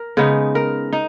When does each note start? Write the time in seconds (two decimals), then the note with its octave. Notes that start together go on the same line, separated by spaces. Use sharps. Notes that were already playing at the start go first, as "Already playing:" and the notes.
Already playing: A#4
0.17 C#3 G#3 B3 D#4
0.55 A#4
0.93 D#4